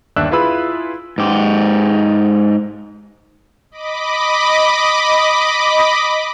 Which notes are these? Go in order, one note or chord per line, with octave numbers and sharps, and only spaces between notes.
G1 D#2 D4 E5 E6 F#6
E4 F4 G#4 B4 B5 E6
G#2 G4
D#5 B5 D6